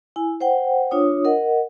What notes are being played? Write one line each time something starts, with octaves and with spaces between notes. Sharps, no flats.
E4 G#5
C5 F#5 G5
D4 F4 C#5 D#6
A#4 D#5 F#5